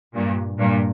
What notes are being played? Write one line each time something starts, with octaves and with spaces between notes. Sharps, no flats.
G2 A#2
G2 A#2